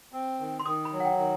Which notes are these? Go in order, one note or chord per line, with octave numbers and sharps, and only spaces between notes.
C4
D#3
C6
D#3 D#6
B5
F#3
F#5
G5
D#3